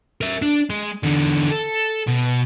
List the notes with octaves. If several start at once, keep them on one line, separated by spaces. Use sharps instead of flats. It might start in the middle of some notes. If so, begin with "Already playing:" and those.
A#4 E5
D4
G#3
E2 D3
A4
B2